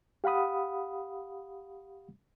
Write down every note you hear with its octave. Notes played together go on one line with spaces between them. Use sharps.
G4 F5 F#5 B5 D#6